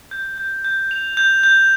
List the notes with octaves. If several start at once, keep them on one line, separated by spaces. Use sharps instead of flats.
G6
G6
G6
F7
G6
G6